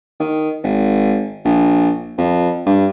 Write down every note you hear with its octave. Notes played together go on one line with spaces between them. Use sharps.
D#3
G#1
A#1
F2
G2